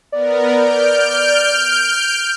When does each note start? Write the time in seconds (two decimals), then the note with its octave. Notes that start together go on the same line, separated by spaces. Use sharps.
0.12 B3 A#4 D5
0.54 F6 G6 D7